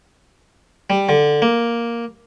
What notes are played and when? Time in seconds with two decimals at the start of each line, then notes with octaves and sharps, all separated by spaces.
0.90 G3
1.09 D3
1.42 A#3